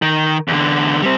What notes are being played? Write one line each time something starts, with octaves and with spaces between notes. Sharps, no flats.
D#3
E2 D3
G3 C4